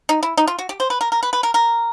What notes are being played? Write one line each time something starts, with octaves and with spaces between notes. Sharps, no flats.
D#4
E4
D#4
F4
F#4
G4
C5
B4
A#4
A#4
B4
B4
A#4
A#4